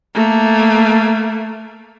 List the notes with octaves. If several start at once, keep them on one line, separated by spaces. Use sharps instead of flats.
A3 A#3